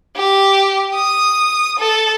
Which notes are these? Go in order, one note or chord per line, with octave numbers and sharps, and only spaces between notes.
G4
D#6
A4